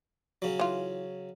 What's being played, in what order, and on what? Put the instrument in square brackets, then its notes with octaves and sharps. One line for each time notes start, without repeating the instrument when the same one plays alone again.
[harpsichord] C#3 F#3
[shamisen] E3 F4